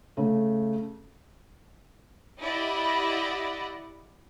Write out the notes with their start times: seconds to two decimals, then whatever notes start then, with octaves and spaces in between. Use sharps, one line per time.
0.17 C#3 A3
2.40 E4 G4 D5 D#5 F#5 B5